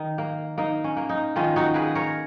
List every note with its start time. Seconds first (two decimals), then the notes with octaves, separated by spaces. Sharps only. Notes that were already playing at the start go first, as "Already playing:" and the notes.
Already playing: D#3 D#4
0.18 A#3
0.58 A#3 D#4
0.84 C#4
0.97 A#3
1.09 D#4
1.36 D#3 C#4 F4
1.56 D#4 F#4
1.74 A#3 G#4 B4
1.95 A#4 C#5